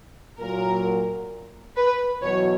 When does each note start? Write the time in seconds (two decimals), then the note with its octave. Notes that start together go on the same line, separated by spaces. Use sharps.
0.38 A#2 F#3 A#3 A#4
1.76 B4
2.22 E2 B2 F#3 C#5